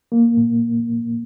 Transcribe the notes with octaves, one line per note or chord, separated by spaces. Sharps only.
A#3
A#2